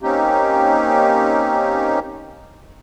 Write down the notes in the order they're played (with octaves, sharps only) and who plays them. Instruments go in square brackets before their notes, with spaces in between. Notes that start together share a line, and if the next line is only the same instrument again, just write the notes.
[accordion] A#3 C4 C#4 D#4 G4